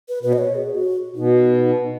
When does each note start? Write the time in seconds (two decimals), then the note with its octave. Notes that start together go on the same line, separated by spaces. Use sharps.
0.09 B4
0.23 B2 B4
0.33 D#5
0.38 C#5
0.55 G#4
0.74 F#4
1.15 B2 D#4